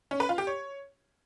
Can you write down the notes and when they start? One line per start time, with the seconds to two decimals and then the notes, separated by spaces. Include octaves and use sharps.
0.11 C#4
0.20 B4
0.29 F4
0.38 G4
0.47 C#5